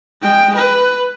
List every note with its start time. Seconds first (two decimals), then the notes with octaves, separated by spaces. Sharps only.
0.22 G#3 G5
0.56 B4